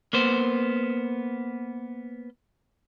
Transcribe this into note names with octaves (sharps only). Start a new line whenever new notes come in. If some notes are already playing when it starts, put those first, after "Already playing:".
A#3 B3 C5